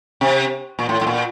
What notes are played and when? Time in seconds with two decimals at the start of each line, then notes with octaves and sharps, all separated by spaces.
0.21 C3
0.79 A#2
0.89 A2
1.01 A2
1.07 A#2